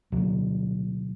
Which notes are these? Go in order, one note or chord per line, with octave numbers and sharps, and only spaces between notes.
D2 B2 F#3